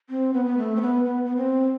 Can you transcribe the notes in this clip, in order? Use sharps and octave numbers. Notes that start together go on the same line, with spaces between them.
C4
B3
B3
A3
C4
B3
B3
B3
C4